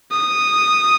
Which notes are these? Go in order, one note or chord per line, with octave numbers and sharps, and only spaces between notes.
D#6